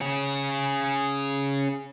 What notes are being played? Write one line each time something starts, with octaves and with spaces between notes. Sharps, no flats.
C#4 G#4